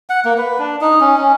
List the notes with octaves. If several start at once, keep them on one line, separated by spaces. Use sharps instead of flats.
F#5
A#3
B4
D4
D#4
C#4
C#4